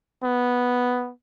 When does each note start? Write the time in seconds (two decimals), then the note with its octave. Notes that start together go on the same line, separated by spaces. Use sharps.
0.23 B3